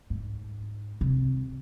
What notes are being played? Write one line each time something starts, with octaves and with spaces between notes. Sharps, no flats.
G#2
C3